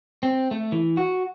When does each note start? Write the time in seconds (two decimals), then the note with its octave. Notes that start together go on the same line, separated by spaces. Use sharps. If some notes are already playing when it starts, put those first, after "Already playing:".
0.23 C4
0.51 A3
0.72 E3
0.97 F#4